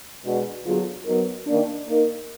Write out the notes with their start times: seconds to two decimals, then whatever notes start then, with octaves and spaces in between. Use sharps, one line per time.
0.23 B2 G#3 D4 F#4
0.65 D3 F#3 B3 F4 G#4
1.05 F#3 B3 D#4 A#4
1.47 D#3 A#3 D4
1.88 A#3 D#4 A#4